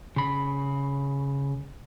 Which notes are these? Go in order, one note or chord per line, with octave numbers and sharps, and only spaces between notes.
C#3 B5